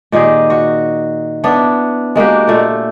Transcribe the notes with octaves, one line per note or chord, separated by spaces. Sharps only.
A#2 D#3 G4 G#4
F#4
B3 D4 E4
G#3 A#3 F#4 G4
A#2 A3